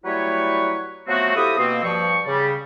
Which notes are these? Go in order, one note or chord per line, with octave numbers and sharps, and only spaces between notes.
F#3 G3 A3 E4 B4 C#5
F3 F#3 A3 B3 C4 F#4
F3 E4 G4 A4 D#6
B2 A#3 C4
G2 F3 C#6
C#3 G3